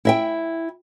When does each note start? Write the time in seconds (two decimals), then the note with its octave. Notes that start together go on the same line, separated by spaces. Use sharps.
0.05 E4 E5 G5